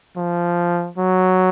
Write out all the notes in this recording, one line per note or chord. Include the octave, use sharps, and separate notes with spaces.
F3
F#3